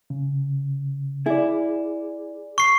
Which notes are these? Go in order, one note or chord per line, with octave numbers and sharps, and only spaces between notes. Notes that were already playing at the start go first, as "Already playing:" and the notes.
C#3
E4 G#4 D5
C#6 C7